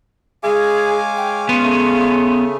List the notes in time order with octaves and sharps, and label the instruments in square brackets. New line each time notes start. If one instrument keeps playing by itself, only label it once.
[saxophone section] G#3 C#5 F5 [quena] G#4 [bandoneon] G#5 D6
[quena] G5
[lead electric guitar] B3 C#4 [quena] C6
[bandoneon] C#3 A3